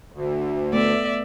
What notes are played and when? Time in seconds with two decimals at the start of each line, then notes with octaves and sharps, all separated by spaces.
0.12 D2
0.73 A3 B3 D5 E5